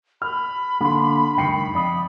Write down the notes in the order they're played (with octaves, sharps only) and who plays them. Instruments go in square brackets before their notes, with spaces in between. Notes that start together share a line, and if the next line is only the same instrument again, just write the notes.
[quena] B5 [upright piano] F6
[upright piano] D3 [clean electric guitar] A#3 C6
[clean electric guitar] C#2 F#2 D#3 [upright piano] G5 C7 C#7
[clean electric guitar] F2 D5 D#5 [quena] B5